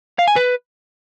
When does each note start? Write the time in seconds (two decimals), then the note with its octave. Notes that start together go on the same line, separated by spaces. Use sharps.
0.19 F5
0.28 G#5
0.36 B4